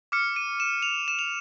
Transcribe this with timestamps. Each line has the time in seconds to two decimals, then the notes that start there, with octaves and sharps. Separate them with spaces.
0.12 D6 F6 C#7
0.36 D#7
0.60 E7
0.82 F7
1.08 E7
1.19 F7